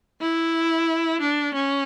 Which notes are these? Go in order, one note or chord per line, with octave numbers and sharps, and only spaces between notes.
E4
D4
C#4